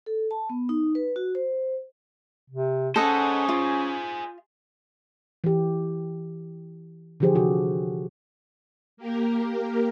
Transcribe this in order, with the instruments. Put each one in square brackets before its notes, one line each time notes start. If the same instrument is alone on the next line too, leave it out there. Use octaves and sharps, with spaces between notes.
[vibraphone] A4
A5
B3
D#4
B4
F#4
C5
[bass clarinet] C3
[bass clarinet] C#4 [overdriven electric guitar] G#4 C5 [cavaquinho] A4 D#5 F#5
[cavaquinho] F4
[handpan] E3 G4
D3 E3 F3 G4 G#4 C5
C3 F#4 A4
[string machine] A#3 G4 A#4